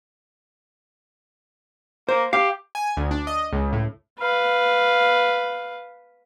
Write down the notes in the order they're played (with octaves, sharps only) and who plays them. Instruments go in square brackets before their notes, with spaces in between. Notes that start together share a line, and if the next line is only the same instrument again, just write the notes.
[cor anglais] A#3 [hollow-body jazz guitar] C5
[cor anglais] G4 [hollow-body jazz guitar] F5
[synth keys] G#5
D2
D4
D#5
C#2
A2
[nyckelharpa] B4 F5